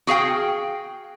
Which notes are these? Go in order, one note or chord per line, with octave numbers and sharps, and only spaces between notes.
F#4 G#4 F5 G5